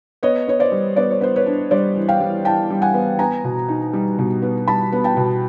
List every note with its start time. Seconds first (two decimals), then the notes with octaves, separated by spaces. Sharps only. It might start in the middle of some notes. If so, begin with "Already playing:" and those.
0.23 B3 C#5 D#5
0.47 B3 C#5
0.60 C5 D5
0.72 G3
0.96 B3 D5
1.11 C#5
1.21 B3 C5
1.36 B4 C#5
1.46 D4
1.71 G3 C5 D5
1.95 E3
2.08 F5 G5
2.20 G3
2.45 E3 G5 A5
2.70 G3
2.82 F#5 G#5
2.94 B3
3.19 B3 G#5 A#5
3.44 B2
3.68 D#4
3.93 G3
4.19 B2
4.42 B3
4.67 G3 A5 B5
4.92 B3
5.04 G5 A5
5.17 B2